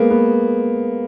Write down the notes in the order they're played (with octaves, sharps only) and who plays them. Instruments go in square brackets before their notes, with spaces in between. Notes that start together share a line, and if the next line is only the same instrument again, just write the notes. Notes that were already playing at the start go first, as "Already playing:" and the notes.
Already playing: [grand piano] G#3 A#3 B3
B3